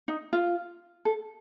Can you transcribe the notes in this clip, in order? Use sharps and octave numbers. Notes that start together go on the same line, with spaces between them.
D#4
F4
A4